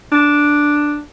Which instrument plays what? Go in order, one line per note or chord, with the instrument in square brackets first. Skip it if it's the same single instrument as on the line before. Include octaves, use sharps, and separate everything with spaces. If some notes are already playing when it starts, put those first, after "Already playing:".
[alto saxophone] D4